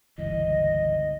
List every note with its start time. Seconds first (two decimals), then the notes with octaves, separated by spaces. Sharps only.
0.18 G1 C#2 E3 D#5